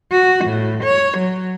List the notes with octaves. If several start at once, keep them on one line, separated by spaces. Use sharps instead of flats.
F#4
A2
C#5
F#3